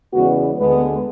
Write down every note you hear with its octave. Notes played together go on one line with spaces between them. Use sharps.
E2 C#3 G#3 B3 F#4
D2 D3 G#3 B3